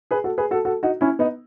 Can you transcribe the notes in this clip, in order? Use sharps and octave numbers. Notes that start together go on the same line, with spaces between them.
G#4 B4
F#4 A4
G#4 B4
F#4 A4
F#4 A4
D#4 F#4
C#4 E4
B3 D#4